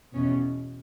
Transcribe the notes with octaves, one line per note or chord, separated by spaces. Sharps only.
E2 B2 C#4